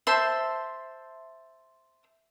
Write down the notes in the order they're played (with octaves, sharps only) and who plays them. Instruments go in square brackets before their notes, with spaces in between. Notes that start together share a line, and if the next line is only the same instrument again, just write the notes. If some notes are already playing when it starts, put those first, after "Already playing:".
[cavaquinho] C5 E5 A5 C6